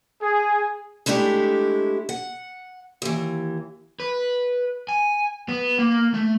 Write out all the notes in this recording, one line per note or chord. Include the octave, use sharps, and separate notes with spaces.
G#4
G#3 A3 D4 E4 G4
F#5
D#2 E3
B4
G#5
B3
A#3
A3